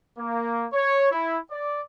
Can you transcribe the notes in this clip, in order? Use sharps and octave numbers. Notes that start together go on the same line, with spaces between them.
A#3
C#5
E4
D5